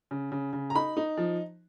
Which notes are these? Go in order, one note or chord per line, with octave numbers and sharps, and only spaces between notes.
C#3
C#3
C#3
A#5
D#4 B5
D#4
F3